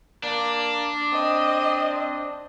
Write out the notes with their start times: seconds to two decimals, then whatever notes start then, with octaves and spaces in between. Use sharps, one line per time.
0.23 A#3 D4
1.13 C4 D#5